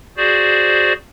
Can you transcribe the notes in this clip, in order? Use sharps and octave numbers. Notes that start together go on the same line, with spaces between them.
F#4 G#4 C5 D5